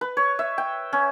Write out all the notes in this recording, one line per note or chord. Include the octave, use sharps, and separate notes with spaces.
B4
C#5
E5
G5
C#4